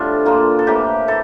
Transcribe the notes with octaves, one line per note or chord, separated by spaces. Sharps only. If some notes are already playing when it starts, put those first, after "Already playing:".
Already playing: A2 D3 G3 C4 D4 F4
A#2 F3 A#3 F4
A4
A2 E3 A#3 G4
E3 A4